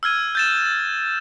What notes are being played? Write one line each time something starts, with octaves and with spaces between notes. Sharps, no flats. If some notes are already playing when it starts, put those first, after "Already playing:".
E6 F6 G#6 D#7
G6 A6 E7